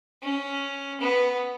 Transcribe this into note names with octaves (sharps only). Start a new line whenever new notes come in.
C#4
B3